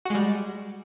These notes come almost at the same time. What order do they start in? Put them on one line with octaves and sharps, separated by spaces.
F#4 G#3 G3